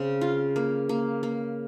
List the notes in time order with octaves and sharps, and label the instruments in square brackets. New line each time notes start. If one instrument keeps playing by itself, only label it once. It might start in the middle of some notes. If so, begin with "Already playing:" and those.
Already playing: [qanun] C#3 C4
F4
A#3
A#3
A#3